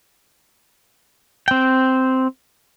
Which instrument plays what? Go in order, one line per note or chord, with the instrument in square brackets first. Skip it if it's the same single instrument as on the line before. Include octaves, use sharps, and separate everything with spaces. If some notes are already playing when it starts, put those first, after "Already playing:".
[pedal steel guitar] C4 G5